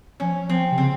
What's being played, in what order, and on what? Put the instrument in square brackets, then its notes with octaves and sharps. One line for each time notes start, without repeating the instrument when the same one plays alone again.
[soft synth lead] F3 [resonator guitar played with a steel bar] C#4
[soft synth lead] F3 [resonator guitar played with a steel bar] C4
[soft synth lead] C3
[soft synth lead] C#3 [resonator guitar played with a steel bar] C4